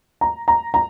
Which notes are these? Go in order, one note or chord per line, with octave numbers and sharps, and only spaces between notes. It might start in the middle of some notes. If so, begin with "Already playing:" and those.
A#5
A#5
A#5